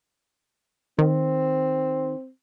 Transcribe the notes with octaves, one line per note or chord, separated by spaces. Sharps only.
D#3 C4